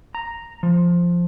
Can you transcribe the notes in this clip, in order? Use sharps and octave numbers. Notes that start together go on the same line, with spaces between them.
A#5
F3